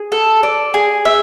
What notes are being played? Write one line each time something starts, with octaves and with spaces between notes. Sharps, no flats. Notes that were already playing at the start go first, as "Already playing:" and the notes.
Already playing: G#4
A4
D5
G#4
E5